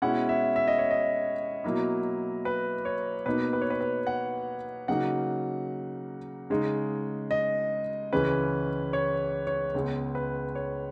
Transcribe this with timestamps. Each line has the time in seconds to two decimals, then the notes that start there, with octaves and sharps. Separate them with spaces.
0.02 B2 G#3 C#4 E4 F#5
0.29 E5
0.56 E5
0.68 D#5
0.79 C#5
0.91 D#5
1.64 B2 F#3 A#3 E4
2.45 B4
2.85 C#5
3.26 B2 A#3 D#4 B4
3.53 B4
3.61 C#5
3.70 B4
3.81 B4
4.07 F#5
4.88 C#3 F#3 A#3 D#4 F#5
6.50 C#3 G#3 D#4
7.31 D#5
8.12 C#2 C#3 E3 G#3 C#4 B4
8.93 C#5
9.47 C#5
9.75 C#2 C#3 G#3 B3
10.15 B4
10.55 C#5